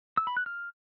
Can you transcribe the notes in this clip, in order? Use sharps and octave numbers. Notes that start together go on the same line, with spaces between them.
E6
B5
F#6
F6